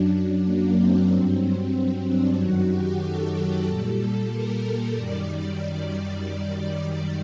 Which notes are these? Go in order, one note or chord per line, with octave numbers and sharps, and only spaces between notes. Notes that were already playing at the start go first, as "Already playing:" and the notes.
Already playing: F#2 F#3 D4
D4
A#3
C4
G2 F#3
C4
D4
F#2 D#3 F#3 F#4
G4
A4
A#2 G3
A#4
A#4
F#2 D#3 G3 D5